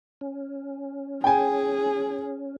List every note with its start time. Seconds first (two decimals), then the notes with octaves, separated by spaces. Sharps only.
0.21 C#4
1.24 G#4 G5 G#5